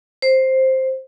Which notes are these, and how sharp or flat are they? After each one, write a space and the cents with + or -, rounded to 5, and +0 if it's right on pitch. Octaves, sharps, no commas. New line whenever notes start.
C5 +5